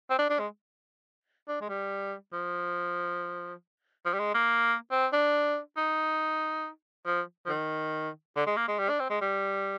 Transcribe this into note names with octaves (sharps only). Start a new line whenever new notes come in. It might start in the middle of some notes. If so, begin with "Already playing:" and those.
C4
D4
D4
G#3
D4
G#3
G3
F3
F3
G3
G#3
A#3
C4
D4
D#4
F3
F3
D#3
D3
G#3
A#3
G#3
G3
D4
C4
G#3
G3